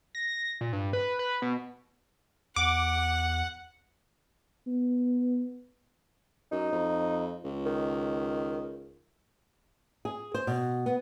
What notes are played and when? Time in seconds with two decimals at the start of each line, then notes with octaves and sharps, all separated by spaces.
0.15 A#6
0.61 A#2
0.73 G2
0.93 B4
1.19 B4
1.42 B2
2.56 E2 F#5 D6
4.67 B3
6.52 F#2 D#4
6.72 F2
7.44 C#2
7.66 D#3
10.05 G#4
10.34 C5
10.47 B2
10.86 B3